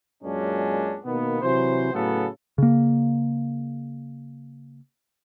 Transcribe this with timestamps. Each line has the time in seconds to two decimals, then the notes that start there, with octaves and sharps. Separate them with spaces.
0.23 F#2 A#2 G#3 C#4 D4
1.04 B2 D#3 A#3 B3
1.42 C3 E3 F#3 C5
1.93 A2 C#3 F#3 B3 A4
2.58 C#3 A#3